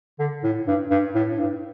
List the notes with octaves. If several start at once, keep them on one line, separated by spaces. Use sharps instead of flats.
D3
A2
G2
G2
A2
A2
G2